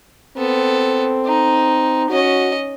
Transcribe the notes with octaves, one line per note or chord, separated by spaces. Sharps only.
B3 C4 A4
D#4
C#4 F#4 D#5